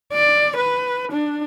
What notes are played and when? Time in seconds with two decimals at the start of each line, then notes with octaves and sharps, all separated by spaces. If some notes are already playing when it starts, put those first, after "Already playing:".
0.13 D5
0.57 B4
1.12 D4